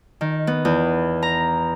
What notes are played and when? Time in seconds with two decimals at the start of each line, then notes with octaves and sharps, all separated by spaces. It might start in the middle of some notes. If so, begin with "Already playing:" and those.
0.21 D#3
0.47 B3
0.65 E2
1.22 A#5